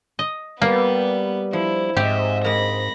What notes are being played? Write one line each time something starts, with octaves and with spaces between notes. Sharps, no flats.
D#5
G3 A#3 B3 B4
F3 E4
G#2 C4 G4 D#5 E5
G#3 A#3 B5 A#6